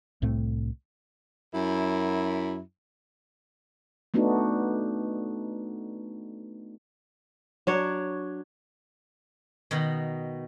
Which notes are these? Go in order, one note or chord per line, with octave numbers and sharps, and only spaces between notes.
C2 A2 A3 C4
F#2 E4
A3 B3 D4 D#4 F#4
F#3 D4 C#5
B2 D#3